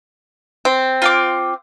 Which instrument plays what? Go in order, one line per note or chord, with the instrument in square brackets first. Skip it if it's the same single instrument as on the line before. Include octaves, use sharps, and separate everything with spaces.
[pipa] C4
[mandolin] F4 C6 D6